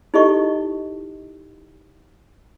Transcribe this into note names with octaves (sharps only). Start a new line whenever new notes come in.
D#4 E4 G4 A4 D#5 C#6